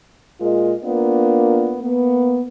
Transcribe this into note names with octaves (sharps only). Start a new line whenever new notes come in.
A#2 G#3 F4 A#4 D#5
A#3 B3 D4 F4 A#4
A#3 B3